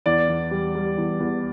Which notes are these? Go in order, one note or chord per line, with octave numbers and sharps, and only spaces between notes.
E2 D5
E2
G3
G3
E2
E2